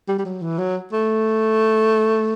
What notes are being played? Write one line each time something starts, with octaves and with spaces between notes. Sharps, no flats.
G3
G3
F#3
E3
F#3
A3